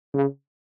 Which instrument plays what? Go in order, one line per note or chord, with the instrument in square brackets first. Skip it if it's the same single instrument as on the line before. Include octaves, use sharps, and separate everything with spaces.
[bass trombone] C#3